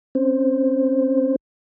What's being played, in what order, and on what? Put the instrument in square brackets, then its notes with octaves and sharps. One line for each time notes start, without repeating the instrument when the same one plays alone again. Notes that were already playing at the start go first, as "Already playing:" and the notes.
[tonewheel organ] C4 C#4 C5